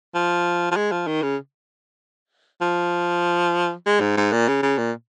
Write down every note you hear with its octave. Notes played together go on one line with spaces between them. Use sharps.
F3
F3
G#3
F3
D#3
C#3
F3
G#3
G#2
G#2
A#2
C#3
C#3
A#2